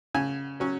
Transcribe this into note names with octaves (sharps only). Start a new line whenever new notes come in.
C#3 G#5
F#3 C#4